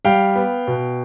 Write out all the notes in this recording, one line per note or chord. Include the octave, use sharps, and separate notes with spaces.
G3 F5 G5
B3
B2